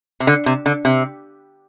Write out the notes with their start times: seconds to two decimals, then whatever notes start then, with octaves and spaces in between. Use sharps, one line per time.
0.20 C3
0.27 D3
0.46 C3
0.66 D3
0.85 C3